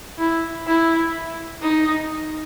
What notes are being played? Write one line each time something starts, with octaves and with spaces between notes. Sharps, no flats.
E4
E4
D#4